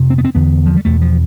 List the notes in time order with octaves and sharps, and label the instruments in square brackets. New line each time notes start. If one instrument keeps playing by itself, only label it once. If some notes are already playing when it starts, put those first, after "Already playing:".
Already playing: [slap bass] F2 C3
C4
B3
C4
E2 D3 B3
F3
G3
E2 B2 A3
F3